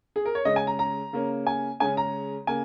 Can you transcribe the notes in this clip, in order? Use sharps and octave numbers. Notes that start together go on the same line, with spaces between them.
G#4
A#4
C#5
C#3 G#3 C#4 D#5
G#5
A#5
A#5
C#3 A#3 C#4
G#5
C#3 G#3 C#4 G#5
A#5
C#3 A#3 G#5